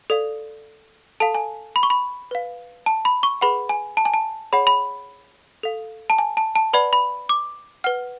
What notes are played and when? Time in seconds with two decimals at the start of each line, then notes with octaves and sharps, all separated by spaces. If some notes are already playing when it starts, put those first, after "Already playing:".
0.10 A4 D5 F5
1.20 A4 F5 A5
1.35 G#5
1.76 B5
1.83 C#6
1.90 B5
2.31 B4 F5
2.86 A5
3.05 B5
3.23 C#6
3.41 G#4 B4 F#5 B5
3.69 G#5
3.97 A5
4.05 G#5
4.14 A5
4.53 G#4 C#5 F#5 B5
4.67 B5
5.63 A4 F5
6.10 A5
6.19 G#5
6.37 A5
6.56 A5
6.73 B4 D5 F#5 B5
6.93 B5
7.29 D6
7.84 B4 F#5 F6